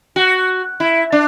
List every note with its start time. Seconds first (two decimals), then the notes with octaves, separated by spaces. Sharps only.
0.16 F#4
0.80 E4
1.12 D4